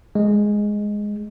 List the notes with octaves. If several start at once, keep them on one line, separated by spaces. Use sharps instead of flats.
G#3